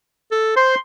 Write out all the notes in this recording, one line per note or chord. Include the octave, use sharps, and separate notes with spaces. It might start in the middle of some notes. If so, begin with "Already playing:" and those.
A4
C5 C6